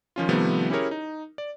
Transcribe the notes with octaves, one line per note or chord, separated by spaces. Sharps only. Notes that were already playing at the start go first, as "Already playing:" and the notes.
D#3 F3 C#4 F4
C3 D#3 F3 G3 A3 B3
C#4 E4 G4 G#4 A#4 C#5
D#4
D5